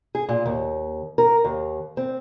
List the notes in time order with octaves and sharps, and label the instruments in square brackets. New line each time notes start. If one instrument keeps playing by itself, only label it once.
[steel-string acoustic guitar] G#4
A#2
D#2
A#4
D#2
C4